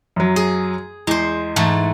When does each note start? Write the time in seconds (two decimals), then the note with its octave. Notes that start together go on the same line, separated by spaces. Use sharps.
0.16 F#2 F#3
0.36 G#4
1.07 E2 G#3 C5
1.56 G#2 E3 A3